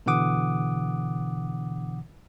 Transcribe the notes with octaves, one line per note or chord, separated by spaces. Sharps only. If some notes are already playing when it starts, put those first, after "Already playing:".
B2 D3 E3 F#5 D6 D#6